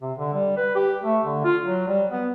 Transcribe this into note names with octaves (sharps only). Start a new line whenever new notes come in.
C3
D3
G3
B4
G4
A3
D3
F4
F#3
G3
B3